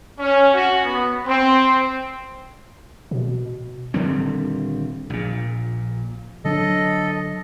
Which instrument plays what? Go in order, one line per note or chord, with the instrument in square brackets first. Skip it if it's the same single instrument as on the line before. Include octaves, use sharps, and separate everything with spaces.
[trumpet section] C#4
F#4
B3
C4
[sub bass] B2
[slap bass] D#1 D3 G3 C4
A#1 A#2
[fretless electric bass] D3 F#3 D4 [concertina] A4 D#5